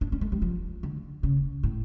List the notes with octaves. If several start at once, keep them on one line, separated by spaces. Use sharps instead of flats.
D4
C#4
A3
G3
F3
D3
C#3
A2